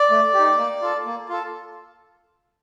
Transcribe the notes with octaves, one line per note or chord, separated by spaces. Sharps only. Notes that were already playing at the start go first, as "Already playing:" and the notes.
Already playing: D5
A3
G4
D#4
A#3
F4 A4
A#3
F4 A4